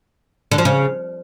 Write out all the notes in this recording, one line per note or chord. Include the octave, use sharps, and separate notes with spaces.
D3
F3
C#3